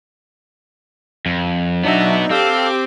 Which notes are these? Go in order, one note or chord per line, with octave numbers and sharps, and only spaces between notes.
F2
F#3 B3 D4 D#4 F#4 E5
C4 G4 A4 F5 D6